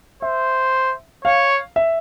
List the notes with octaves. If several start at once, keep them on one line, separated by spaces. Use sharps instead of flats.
C5 E5
C#5 F5
E5